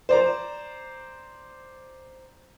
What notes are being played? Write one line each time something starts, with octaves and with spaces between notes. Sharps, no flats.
C5 D5 A#5